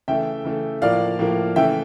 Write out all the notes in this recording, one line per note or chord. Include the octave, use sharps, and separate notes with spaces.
C#3 E3 A3 E5 G5
C#3 E3 A3
A2 F3 A#3 D5 F5
A2 F3 A#3
C#3 E3 A3 E5 G5